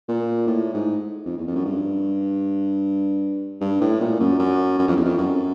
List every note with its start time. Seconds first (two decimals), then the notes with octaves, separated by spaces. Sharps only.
0.08 A#2
0.47 A2
0.74 G#2
1.26 F2
1.38 E2
1.47 F2
1.56 F#2
1.65 G2
3.61 G2
3.81 A2
4.00 A#2
4.20 F#2
4.39 F#2
4.79 F#2
4.88 F2
4.96 E2
5.05 F2
5.18 F#2